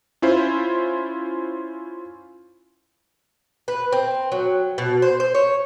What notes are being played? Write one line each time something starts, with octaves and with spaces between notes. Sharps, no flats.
C#4 E4 F4 C5
B4
C4
F#3
B2
C5
C5
C#5